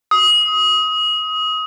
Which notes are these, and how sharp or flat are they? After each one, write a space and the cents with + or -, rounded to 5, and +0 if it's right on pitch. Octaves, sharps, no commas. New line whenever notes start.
D#6 +25